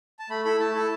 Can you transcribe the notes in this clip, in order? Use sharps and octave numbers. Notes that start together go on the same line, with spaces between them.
A5
A3 B5
E4 A4 B5
A3 A5
E4 A4